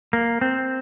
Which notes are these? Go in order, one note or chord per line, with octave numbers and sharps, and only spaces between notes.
A#3
C4